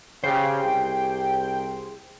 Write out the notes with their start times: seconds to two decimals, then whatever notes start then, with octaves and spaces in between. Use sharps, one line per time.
0.24 C#3 G4 G#4 C5 G5
0.64 C2